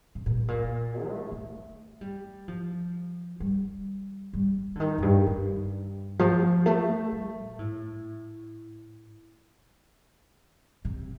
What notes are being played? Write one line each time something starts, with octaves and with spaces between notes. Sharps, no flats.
C3
A#2
A2
A#2
A3
A3
G3
F3
G3
G3
D3
D#3
F2
G2
G2
F3
A3
G3
A#2
A2
C3